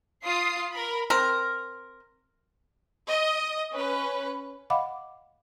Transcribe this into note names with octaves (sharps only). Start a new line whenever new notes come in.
F4 D#6 C7
A#4 B5
C4 A#4
D#5
C#4 B4
D#5 F5 F#5 B5 D6